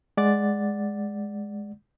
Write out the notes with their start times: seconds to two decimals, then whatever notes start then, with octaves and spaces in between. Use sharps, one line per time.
0.17 G#3 D5 F#5 A6